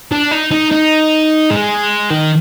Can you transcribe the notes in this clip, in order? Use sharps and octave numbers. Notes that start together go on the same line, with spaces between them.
D4
D#4
D#4
D#4
G#3
D#3